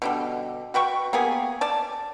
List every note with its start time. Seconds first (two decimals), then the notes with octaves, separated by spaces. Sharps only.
0.02 B2 D3 G3
0.74 F#4 B4 G5 C#6
1.13 A#3 B3 G4 G#4
1.61 D5 A5